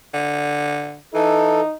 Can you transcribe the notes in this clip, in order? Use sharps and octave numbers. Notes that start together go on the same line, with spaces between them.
D3
E3 D#4 A4